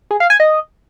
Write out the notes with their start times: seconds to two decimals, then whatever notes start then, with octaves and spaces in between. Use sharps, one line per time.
0.11 G#4
0.20 F5
0.30 G#5
0.40 D#5